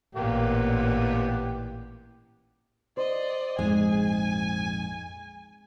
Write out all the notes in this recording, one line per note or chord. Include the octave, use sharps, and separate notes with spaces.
A1 A#2 A#3 B3 G4
C5 D5 D#5
A#1 F2 G#2 G#3 G#4 G#5